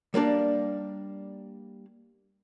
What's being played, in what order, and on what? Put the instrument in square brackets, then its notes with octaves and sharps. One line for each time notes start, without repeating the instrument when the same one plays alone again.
[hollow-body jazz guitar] G3 A#3 D4 D5